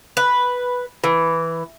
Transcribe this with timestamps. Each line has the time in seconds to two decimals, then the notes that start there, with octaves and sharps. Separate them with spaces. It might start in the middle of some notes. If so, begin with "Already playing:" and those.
0.17 B4
1.04 E3